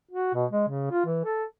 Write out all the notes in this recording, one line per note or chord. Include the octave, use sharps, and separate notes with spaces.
F#4
B2
G#3
C#3
F4
E3
A4